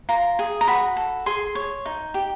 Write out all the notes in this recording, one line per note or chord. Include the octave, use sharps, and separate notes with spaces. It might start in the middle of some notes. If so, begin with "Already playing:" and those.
F4 A#5
G#4
A#5
F#4 B5
A4
G#4 C6
C#5
D#4
G4